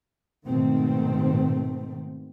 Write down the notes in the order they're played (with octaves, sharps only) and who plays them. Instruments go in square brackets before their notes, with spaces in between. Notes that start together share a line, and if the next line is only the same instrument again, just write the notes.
[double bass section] G#2 B2 D#3 A3 C4